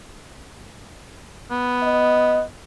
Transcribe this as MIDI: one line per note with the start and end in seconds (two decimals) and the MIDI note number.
1.51 2.45 59
1.83 2.42 75